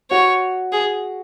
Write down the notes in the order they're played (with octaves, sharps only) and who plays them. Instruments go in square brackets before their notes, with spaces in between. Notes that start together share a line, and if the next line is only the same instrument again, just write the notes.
[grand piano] F#4 [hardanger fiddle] C#5
[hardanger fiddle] G#4